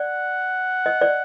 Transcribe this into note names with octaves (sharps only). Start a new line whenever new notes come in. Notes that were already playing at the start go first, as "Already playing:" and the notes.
Already playing: D5 F#5
D#5
D5